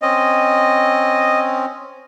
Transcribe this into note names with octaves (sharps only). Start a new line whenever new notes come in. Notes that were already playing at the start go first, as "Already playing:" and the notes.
C4 C#4 D#5